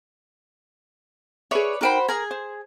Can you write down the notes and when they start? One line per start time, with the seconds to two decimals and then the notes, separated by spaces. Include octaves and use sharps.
1.51 G#4 B4 C#5 D5 E5
1.81 D#4 F#4 A#4 C5 G5 B5
2.08 G#4 A#4 G#5
2.31 C5